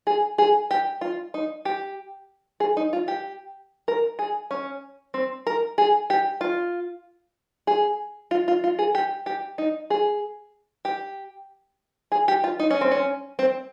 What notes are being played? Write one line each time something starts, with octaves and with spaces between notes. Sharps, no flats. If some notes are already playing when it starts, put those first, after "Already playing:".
G#4
G#4
G4
F4
D#4
G4
G#4
D#4
F4
G4
A#4
G#4
C#4
C4
A#4
G#4
G4
F4
G#4
F4
F4
F4
G#4
G4
G4
D#4
G#4
G4
G#4
G4
F4
D#4
C#4
C4
C#4
C4